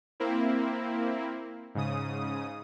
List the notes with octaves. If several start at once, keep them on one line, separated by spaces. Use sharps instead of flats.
A#3 C4 E4
G#2 C#3 D#6